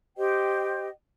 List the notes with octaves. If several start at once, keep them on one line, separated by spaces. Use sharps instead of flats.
G4 C5 D#5 G5